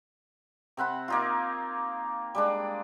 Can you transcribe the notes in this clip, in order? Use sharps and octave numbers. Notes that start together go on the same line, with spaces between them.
C3 C4 F#5 B5
A#3 D#4 F4
G3 G#3 D4